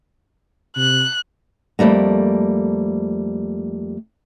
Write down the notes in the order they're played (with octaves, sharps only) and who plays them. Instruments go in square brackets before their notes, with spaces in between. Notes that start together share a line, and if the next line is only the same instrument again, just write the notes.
[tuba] C3 [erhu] F#6
[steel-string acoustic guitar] F2 D3 G3 A3 A#3